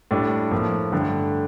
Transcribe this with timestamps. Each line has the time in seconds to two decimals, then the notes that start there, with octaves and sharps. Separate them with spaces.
0.11 A2 G3 D4
0.51 A2 F3 A#3
0.92 G2 D3 A3